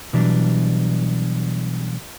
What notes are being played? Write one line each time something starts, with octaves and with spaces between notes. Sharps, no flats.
B2 E3 F#3 G3 D4